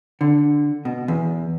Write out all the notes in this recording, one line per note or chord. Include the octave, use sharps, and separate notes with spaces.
D3
B2
E2